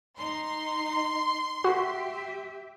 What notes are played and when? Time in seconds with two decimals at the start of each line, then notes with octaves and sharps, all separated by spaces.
0.18 D#4 C6
1.64 F#4 G4 E5